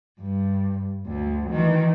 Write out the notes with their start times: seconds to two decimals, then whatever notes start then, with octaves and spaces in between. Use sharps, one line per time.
0.20 G2
1.07 D2
1.51 D#3 E3